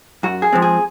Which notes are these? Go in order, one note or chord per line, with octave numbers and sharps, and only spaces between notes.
F#2 F#4
G#4
F3 G#3 C4
G#4